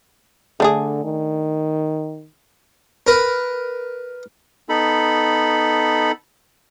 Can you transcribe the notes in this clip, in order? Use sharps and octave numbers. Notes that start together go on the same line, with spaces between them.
D3 A3 D4 G#4
D#3
A#4 B4
B3 D#4 A4 B5